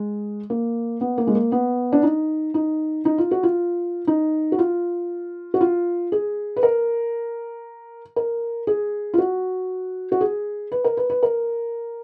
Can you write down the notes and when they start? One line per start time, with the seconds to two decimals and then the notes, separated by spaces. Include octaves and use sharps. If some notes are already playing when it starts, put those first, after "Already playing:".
Already playing: G#3
0.50 A#3
1.01 B3
1.18 A#3
1.27 G#3
1.35 A#3
1.52 B3
1.92 D4
2.03 D#4
2.54 D#4
3.05 D#4
3.18 F4
3.31 F#4
3.43 F4
4.07 D#4
4.52 F#4
4.59 F4
5.54 F#4
5.61 F4
6.12 G#4
6.56 B4
6.63 A#4
8.16 A#4
8.67 G#4
9.14 F4
9.18 F#4
10.12 F#4
10.21 G#4
10.72 B4
10.84 A#4
10.97 B4
11.10 B4
11.23 A#4